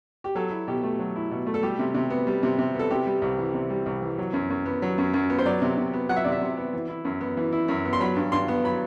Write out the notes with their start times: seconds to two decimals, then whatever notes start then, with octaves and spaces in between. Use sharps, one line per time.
0.24 G4
0.35 F#3 A4
0.51 E4
0.68 B2 G4
0.83 A3
0.99 F#3
1.16 E4
1.31 B2
1.47 A3
1.54 A4
1.63 G3 G4
1.79 C3
1.94 C3
2.10 B3
2.27 G3
2.43 C3
2.59 C3
2.75 B3 A4
2.90 C3 G4
3.06 G3
3.22 C2
3.39 E3
3.54 C3
3.70 G3
3.86 C2
4.02 E3
4.18 F#3
4.33 F#2
4.50 F#2
4.66 B3
4.82 F#3
4.98 F#2
5.14 F#2
5.30 B3
5.39 C5
5.45 F#3 D5
5.62 C3
5.77 C3
5.94 B3
6.09 F#3 F#5
6.16 E5
6.24 C3 D5
6.32 E5
6.41 C3
6.57 B3
6.73 E3
6.89 E4
7.05 F#2
7.21 B3
7.37 E3
7.52 E4
7.68 F#2
7.85 B3
7.93 C6
8.00 F#3 B5
8.16 G2
8.32 G2 C6
8.48 B3
8.64 F#3 B5